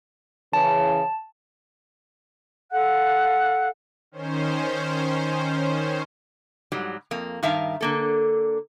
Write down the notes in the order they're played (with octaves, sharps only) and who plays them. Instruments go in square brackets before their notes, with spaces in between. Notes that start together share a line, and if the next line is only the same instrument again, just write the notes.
[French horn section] C#3 E3 [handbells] A5
[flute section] A4 F5 F#5 F#6
[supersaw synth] D#3 C#4 C5
[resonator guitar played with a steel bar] G#2 F#3 G3
F2 A#3
G2 D#3 A#4 E5 F5 A5
D3 A#3 A4